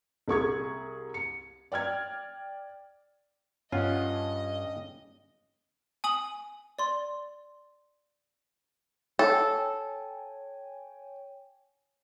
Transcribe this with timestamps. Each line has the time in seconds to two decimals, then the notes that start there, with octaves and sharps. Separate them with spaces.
0.28 C2 G#4 C#6 G#6
1.14 C#7
1.72 D5 G5 F6 G#6
3.72 G2 C#4 F4 D#5 F#5
6.04 G#5 D#6 F#7
6.79 D5 C6
9.19 A4 C#5 G5 G#5